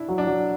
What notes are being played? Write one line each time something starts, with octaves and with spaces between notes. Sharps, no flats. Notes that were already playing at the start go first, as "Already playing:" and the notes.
Already playing: D4 E4
F#3
D4
F#3